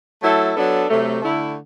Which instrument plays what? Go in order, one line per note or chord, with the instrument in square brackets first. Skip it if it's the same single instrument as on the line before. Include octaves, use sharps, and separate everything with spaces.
[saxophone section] F#3 A3 E4 A4
F#3 B3 D4 A4
C3 F#3 A3
D3 A3 E4